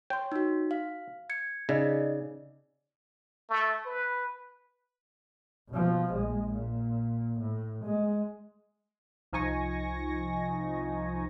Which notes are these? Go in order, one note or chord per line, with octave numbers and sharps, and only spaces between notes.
C#5 G5 C6
D#4 F#4
F5
G#6 C#7
C#3 D#4 D5 D#5
A3
B4
B2 F3
A#1 G#3
A#2
A2
G#3
C2 F3 D#4 G#5 C#6 A#6